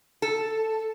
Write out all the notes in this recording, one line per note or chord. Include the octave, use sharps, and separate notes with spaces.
A4